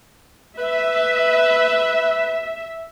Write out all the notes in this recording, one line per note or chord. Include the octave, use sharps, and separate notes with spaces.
B4 E5